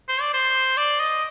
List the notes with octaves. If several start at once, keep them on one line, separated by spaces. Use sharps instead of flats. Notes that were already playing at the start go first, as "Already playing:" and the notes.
C5
D5
C5
D5
D#5